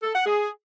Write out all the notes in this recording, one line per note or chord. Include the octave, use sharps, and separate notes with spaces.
A4
F#5
G#4